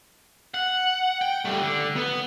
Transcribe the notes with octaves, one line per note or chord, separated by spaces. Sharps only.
F#5
G5
G3 A3
D3
B3